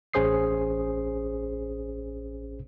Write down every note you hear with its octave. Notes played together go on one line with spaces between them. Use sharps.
A1 C#4 G#4 C5 D#6 C7